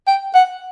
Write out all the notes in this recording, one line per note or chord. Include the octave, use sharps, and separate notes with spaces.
G5
F#5